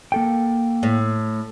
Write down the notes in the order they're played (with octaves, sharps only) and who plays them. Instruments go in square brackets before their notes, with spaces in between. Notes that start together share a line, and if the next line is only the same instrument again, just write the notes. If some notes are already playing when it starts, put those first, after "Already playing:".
[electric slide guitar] A#3 A4 G5
[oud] A2